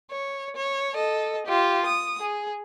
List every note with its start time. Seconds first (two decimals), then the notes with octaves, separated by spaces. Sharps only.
0.11 C#5
0.56 C#5
0.95 A4 D#5
1.47 F4 G4
1.86 D#6
2.20 G#4